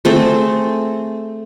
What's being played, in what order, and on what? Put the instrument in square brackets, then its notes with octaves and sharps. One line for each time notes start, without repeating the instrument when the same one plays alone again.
[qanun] A3 C4 G#4 A4